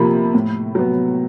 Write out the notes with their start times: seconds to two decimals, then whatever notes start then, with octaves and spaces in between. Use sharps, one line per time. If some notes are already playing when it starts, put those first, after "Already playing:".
Already playing: C3 F3 A#3 B5
0.34 A2
0.75 F#3 B3